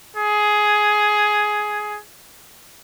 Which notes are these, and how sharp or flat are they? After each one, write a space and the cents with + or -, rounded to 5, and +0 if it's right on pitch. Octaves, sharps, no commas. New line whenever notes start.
G#4 +10